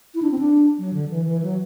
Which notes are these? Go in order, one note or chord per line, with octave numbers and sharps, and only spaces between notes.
E4
D4
C4
D4
F#3
D3
E3
E3
F#3